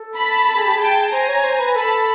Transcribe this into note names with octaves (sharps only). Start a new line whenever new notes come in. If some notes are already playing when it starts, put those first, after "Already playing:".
Already playing: A4
A5 B5
A4
G#4
G4
G#4
G5 A5
C5 G#5 A#5
C#5
C5
B4
A4 A5 B5